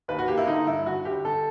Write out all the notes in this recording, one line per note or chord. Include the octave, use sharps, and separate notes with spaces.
D#2 B4
F#4
A#3 G4
E4
D3 D#4
G2 E4
G1 F#4
G1 G4
D3 A4